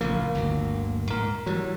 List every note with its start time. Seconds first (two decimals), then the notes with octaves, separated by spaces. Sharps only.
0.01 A1 C#3 F3 A#3
0.35 G1 D2 F#3
1.11 G#2 A#4
1.47 E3 F#3 G3